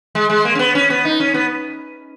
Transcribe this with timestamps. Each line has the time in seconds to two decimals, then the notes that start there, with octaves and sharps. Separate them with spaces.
0.15 G#3
0.30 G#3
0.45 A#3
0.55 C#4
0.59 B3
0.75 C#4
0.90 B3
1.05 D#4
1.20 C#4
1.34 B3